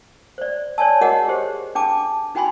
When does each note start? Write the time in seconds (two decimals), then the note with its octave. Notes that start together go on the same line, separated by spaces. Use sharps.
0.38 C5 D5
0.78 C#5 D5 G#5 A5
1.01 F#4 G#4 A#4 C#5 D#5 F#5
1.28 G4 G#4 C5
1.75 D4 G5 A5 D6
2.35 D#4 F#4 G5 G#5 B5 C6